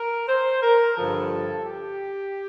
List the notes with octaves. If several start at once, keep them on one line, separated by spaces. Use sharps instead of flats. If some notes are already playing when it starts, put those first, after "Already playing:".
Already playing: A#4
C5
A#4
G2 D3 F3 A4
G4